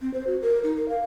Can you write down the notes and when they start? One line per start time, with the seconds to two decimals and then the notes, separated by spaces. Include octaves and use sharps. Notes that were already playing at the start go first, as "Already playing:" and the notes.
0.02 C4
0.14 C5
0.27 F#4
0.42 A#4
0.64 D#4
0.77 A#4
0.89 F5